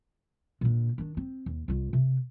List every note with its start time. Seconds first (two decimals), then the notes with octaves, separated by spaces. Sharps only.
0.61 A#2 D3
0.98 D#3 D4
1.17 C4
1.46 D#2
1.68 C2 F4
1.93 C3